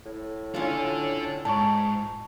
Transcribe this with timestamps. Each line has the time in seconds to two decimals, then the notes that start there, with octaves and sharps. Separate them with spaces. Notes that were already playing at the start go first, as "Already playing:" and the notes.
0.05 A2
0.54 C#4 D4 F4 A4
1.45 G#2 D5 A5 C#6